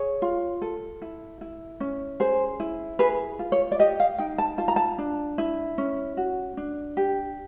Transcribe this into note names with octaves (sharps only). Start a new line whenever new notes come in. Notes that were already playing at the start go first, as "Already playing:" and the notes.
Already playing: G#4 C#5
F4
A4
E4
E4
C#4
G#4 C5
E4
G#4 B4
F4
C#5
D5
G4 D#5
F5
D#4 G5
A5
F4 A5
A#5
A5
D4
E4
C#4
F#4
D4
G4